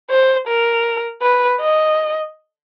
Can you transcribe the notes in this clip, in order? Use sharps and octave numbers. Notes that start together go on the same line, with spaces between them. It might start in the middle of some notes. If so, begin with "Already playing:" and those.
C5
A#4
B4
D#5